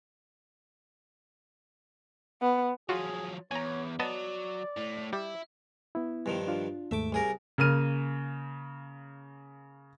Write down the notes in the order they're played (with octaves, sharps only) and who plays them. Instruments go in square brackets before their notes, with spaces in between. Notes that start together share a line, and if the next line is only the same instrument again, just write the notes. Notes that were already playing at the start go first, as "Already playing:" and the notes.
[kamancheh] B3
[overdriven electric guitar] F3 F#3 [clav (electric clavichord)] F4 F#4 [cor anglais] G#4
[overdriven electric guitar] E2 [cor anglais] C#5 [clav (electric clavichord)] G#5 A#5
[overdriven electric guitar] F#3 [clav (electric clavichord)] B3 D#5 A5 [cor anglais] D5
[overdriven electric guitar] A2
[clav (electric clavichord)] G3 [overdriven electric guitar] E4
[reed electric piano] B3 E4
[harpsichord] G2 D#3 F3
[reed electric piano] D4 F4
[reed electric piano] D#2 G#2 A3 [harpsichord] E5 D6
[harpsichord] C2 G#4 A#4
[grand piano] C#3 A#3 F6 D#7